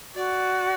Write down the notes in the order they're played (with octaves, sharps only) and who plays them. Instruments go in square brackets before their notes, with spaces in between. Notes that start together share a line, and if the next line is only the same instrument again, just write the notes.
[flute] F#4 [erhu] D5